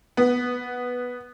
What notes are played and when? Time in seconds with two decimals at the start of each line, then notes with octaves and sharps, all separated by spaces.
0.17 B3